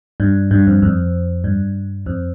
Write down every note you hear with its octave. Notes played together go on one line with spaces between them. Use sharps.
G2
G2
F2
F2
G2
F2